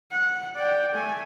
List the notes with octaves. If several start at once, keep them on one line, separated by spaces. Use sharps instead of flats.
F#5
D5 G5
A3 G#5